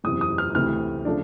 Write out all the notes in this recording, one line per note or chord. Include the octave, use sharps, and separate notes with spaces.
F#1 E2 C3 D#6
D#6
F6
D2 C3 E3 F6
C#3 F3 A3 D4